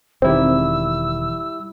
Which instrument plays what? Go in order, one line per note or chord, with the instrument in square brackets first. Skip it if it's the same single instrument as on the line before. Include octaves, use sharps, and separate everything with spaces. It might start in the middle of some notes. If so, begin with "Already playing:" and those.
[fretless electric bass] E1 D#3 [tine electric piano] G3 E4 G4 [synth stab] C4 [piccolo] E6